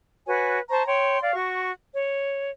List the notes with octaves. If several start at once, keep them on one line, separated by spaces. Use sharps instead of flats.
F#4 B4 C#5 G#5
C5 A5 A#5 C#6
C#5 G5 C6
D5 F5
F#4 C#6
C#5